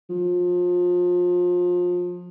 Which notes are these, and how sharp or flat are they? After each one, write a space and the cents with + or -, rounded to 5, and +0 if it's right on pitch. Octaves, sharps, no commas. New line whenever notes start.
F3 +30